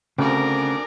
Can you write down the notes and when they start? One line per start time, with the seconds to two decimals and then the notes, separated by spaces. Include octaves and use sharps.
0.18 D2 C#3 C4 D4 G#4 A#4 D6